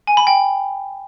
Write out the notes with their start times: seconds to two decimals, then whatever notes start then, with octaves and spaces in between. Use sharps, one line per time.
0.07 G#5
0.17 B5
0.27 G5